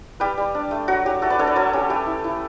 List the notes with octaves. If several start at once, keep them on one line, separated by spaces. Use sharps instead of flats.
G3 G4 B4
G3
D4
A3
F#3 F#4
F#3 G4
A3 F#4 A4
B4 D5
D4 A4 C#5
B4 D5
F#3 A4 C#5
C#4 G4
A3 G4 B4
E4
E4